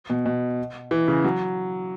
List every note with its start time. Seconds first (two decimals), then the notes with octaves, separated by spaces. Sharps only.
0.10 B2
0.26 B2
0.91 E3
1.08 C#3
1.24 F#3